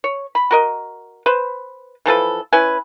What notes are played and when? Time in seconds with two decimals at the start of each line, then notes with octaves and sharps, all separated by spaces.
0.04 C#5
0.35 B5
0.51 F#4 A#4 D#5
1.26 B4 C5
2.06 E3 F3 A4 B4
2.52 C#4 E4 B4 G#5